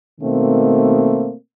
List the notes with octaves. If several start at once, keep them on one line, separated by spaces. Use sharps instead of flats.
B2 D#3 A3 A#3 C4